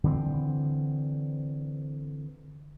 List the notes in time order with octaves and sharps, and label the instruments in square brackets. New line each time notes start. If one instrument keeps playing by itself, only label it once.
[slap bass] D3 E3 A#3 C4